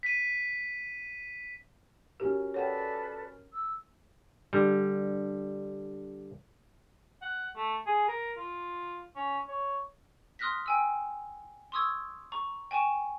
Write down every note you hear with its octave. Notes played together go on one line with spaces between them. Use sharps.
B6 D#7
C#4 F#4 G4 A#4
A4 B4 C#5 D5 F#5 G5
E6
D3 G3
F#5
A3
G#4
A#4
F4
C#4
C#5
C6 D#6 F6 F#6 A#6 B6
G5 G#5 E6
C6 C#6 D#6 E6 G#6
A#5 C#6
G5 G#5 C#6 E7